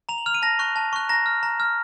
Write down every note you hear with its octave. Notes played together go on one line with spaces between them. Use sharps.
A#5 F7
F#7
F6 F7
D#7
A5 A#6
C#6 F#6
A5
C#6 F#6
A#5 A#6
F6
A#5
F6